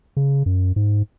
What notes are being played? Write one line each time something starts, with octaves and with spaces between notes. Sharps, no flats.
C#3
F#2
G#2